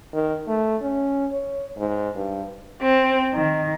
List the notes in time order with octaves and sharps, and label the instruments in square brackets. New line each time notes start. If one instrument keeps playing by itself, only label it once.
[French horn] D#3
A3
C#4
C#5
G#2
G2
[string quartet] C4
D#3